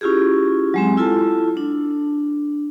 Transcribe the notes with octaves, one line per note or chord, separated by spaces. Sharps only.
C#4 E4 F4 G4 G#4
F#3 G#3 C4
E4 F4 A4 A5
D4